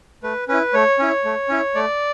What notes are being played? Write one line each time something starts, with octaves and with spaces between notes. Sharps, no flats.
A3 B4
C#4 E4 B4
A3 C#5
C#4 E4
A3
C#4 E4
A3 D5